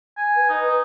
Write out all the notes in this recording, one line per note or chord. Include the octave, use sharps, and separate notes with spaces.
G#5
B4
D#4